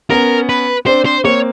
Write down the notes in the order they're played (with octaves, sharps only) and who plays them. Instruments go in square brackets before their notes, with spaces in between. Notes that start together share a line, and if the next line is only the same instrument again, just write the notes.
[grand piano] B3 C#4 [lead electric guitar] A#4
[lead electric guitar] B4
[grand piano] C4 D4 [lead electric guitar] C5
[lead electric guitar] C5
[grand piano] A#3 C4 [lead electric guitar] C#5